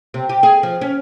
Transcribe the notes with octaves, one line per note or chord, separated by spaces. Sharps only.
C3
G4
G#4
F3
C#4